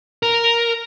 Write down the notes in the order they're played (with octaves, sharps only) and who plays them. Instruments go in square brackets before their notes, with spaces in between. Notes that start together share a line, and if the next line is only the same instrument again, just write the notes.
[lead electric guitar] A#4